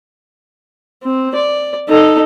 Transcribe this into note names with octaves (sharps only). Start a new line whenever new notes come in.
C4
D5
D#4 A4